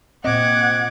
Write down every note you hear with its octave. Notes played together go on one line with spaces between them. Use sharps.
A#2 C4 D#5 F#5 D6 G#6